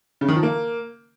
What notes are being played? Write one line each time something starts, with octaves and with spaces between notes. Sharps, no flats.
C#3
D#3
F3
A#3